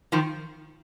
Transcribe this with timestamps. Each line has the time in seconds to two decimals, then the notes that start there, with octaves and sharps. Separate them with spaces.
0.12 D#3 F3